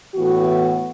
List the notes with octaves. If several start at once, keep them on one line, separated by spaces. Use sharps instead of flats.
A2 E3 B3 F#4